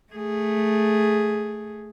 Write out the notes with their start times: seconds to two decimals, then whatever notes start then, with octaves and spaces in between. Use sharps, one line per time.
0.13 A3 G#4